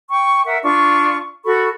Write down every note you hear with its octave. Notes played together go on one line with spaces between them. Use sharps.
G5 C#6
A#4 E5 F#5
D4 F4 C#6
F#4 A4 B5 C#6